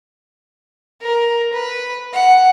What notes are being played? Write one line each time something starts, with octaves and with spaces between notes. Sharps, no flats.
A#4
B4
F#5